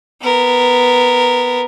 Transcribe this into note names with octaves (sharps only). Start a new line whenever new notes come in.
B3 A#4